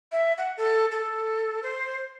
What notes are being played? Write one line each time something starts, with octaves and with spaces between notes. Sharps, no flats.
E5
F#5
A4
A4
C5